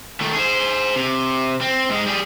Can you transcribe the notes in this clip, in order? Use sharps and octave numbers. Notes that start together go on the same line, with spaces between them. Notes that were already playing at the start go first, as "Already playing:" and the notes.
D#3 A3
G#4 C5
C3
C4
G#2 G#3
G3 G#4